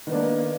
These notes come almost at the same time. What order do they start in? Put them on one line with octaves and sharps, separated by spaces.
D#3 B3 D4 A#3